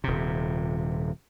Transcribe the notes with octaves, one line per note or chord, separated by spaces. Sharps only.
D#1 C3